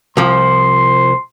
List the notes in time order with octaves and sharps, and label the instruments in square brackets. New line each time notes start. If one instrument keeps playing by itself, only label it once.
[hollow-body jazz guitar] C2 F3 [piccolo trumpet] C6